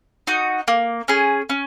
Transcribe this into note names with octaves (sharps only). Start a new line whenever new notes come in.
D#4 F#4
A#3
C#4 G#4
C#4